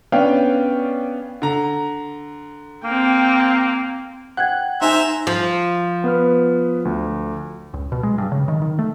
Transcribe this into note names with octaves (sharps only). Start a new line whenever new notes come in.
B3 C#4 D4 C#5 F5 G5
D3 A#5
A#3 C4 G5
F#5 G5 F#6 G#6
D#4 C5 E5 G#5 A#5
F3
B3 B4 F6
D2
C#2
B2
G#3
G2
C#3
D#3
D#3
A3